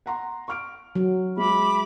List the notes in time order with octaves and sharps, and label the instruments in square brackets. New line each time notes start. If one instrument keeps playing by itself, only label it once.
[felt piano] F#5 A#5 C6
C#6 F6 D7
[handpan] F#3
[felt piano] G#3 [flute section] E5 B5 D6